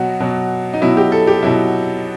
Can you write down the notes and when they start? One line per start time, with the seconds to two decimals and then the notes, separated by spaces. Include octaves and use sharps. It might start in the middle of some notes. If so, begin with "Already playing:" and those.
Already playing: B2 F#3 F#4
0.20 B2 F#3
0.73 D#4
0.81 B2 F#3 E4
0.97 G4
1.12 A4
1.27 G4
1.43 B2 F#3 E4